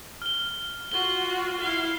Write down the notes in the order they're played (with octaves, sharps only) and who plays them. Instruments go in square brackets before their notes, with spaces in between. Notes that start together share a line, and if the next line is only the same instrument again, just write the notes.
[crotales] F6 G7
[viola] F4 F#4 [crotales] G7
[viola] E4 F5